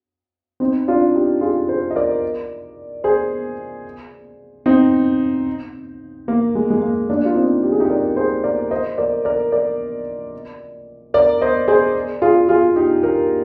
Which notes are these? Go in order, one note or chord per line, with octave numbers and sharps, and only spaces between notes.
C4 D#4
D4 F4
D#4 G4
F4 G#4
G#4 C5
D#5
A#4 D5
G#4 C5
C4 D#4
A#3
G#3
G#3
A#3
A#3 D4
F4
C4 D#4
G4
G#4
D#4 G4
A#4 D5
G#4 C5
A#4 D5
C5 D#5
A#4 D5
A#4 D5
A#4 D5
A#4 D5
C5 D#5
G#4 C5
F4 G#4
F4 G#4
D#4 G4
G4 A#4